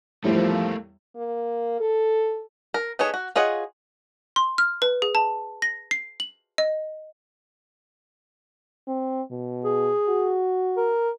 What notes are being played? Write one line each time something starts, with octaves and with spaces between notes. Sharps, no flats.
E2 A2 F3 G3 A3 A#3
A#3
A4
A#4
B3 D#4 G#4 A4 C#5
F#4
F4 G#4 C#5 D#5 F#5
C6
F6
B4
G#4
A5
A#6
C7
F#7
D#5
C4
B2
G#4
F#4
A#4